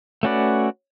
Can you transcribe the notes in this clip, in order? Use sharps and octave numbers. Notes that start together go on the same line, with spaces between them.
A3 C#4 F#4 B4 D5